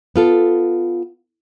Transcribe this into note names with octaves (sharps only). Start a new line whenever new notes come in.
B3 F4 A4